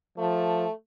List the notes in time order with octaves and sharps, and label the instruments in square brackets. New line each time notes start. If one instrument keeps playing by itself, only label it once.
[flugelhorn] F3 [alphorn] A3